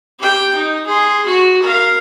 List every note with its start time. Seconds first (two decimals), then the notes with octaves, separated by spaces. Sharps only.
0.19 G4 G5
0.55 D#4
0.86 G#4 C6
1.26 F#4
1.62 A#4 F5